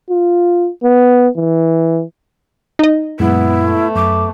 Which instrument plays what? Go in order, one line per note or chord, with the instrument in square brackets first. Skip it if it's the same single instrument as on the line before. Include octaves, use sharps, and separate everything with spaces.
[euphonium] F4
B3
E3
[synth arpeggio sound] D#4 D#5
[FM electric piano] F#2 A#2 G#3 [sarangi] B3 [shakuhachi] E4
[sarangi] A3
[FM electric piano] F#2 [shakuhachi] D6